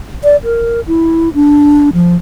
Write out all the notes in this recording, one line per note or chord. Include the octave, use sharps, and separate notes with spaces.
D5
A#4
E4
D4
F3